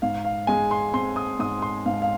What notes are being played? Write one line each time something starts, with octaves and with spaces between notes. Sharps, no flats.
G#2 F5
F5
G#3 G#5
C6
C4 C6
D#6
G#2 D#6
C6
G#2 F5
F5